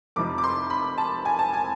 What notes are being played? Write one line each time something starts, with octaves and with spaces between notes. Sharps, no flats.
F1 F2 C3 F3 D6
D6
C6
B5
A5
G#5
A5
G#5